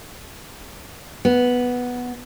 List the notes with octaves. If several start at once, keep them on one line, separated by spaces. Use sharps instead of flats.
B3